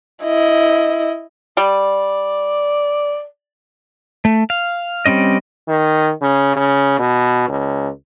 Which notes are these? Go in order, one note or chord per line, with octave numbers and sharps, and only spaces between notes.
E4 D#5
G3 D5
A3
F5
G3 C4 C#4 D#5
D#3
C#3
C#3
B2
C#2